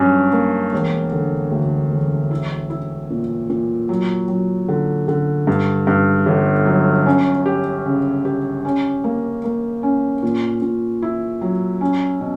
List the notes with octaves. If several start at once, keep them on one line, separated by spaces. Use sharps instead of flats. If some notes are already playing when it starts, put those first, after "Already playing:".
Already playing: G2 F#3 C#4
A#3
E1
D3
D2
E1
E4
E4
A#2
A#2
F#3
F#3
D3
D3
G2
G2
G1
F#3
C#4
G4
C#3
G4
C#4
A#3
A#3
C#4
A#2
A#2
E4
F#3
C#4
B2